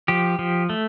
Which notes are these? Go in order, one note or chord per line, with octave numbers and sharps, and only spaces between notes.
F3 G4
F3
A3